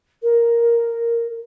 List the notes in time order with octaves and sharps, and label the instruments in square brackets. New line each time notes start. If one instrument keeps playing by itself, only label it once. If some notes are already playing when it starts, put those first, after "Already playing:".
[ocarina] A#4